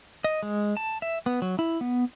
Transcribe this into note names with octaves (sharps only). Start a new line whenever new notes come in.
D#5
G#3
A5
E5
B3
F#3
E4
B3